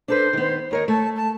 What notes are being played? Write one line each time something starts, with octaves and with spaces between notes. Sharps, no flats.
D4 A4 B4 C5
D#3 B3
D#2 A#4 C#5 D#5
A3 A5
A5